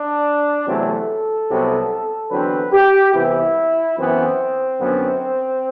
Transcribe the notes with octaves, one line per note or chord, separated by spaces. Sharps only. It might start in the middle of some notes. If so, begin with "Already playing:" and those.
Already playing: D4
E2 C3 F#3 A3 C4 A4
C2 C3 F#3 B3
E2 D3 F#3 C4 B4
G4
C2 C3 E3 B3 E4
F#2 E3 B3 C4
F#2 D3 F#3 B3